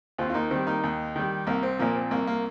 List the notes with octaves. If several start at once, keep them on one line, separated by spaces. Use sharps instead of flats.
D#2 C4 F4
F4
A#3 D#4
D#3 G3 C4
A#3 D#4
D#2
D#3 G3
C2 A#3
C4
A#2 F3 A#3
C4
C2 A#3
A#3